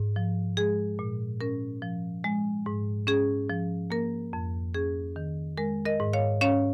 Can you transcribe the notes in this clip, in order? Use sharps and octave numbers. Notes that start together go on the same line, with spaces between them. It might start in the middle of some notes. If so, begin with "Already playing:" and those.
Already playing: G#2
F3
G#3 G#4
A#2
C#4 A#4
F3
G#3
G#2
C#4 G#4
F3
A#3 A#4
F2
C#4 G#4
D#3
G#3 A#4
A#4 D#5
G#2
C#5 F5
C#4 C#5 F5